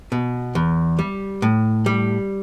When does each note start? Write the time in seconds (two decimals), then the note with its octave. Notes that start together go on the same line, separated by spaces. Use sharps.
0.12 B2
0.55 E2
0.99 G3
1.42 A2
1.86 G3